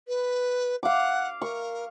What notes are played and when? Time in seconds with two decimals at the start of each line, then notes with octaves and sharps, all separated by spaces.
0.08 B4
0.83 F5 F#5 D6
1.42 A#4 C#6